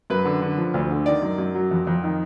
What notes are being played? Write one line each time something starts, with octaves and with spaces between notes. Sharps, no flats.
F#2 B4
D3
D3
F3
D2
D3
D#3 D5
F#2
F#2
F#3
F2
F2
D#3